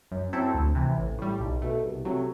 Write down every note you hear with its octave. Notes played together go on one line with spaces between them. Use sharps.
F#2
F#3 C4 E4 A4
D2
C3 E3
A1
A2 G3
B1
B2 A3
C2
C3 F#3 A3